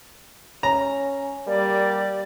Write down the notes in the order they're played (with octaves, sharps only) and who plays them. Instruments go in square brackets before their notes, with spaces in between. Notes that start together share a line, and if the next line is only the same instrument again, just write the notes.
[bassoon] C#4 [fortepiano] A#5
[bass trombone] G3 [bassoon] A#3 [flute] D5